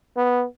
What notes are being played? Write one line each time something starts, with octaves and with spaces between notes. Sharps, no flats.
B3